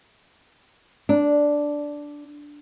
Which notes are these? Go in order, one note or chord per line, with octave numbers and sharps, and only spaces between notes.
D4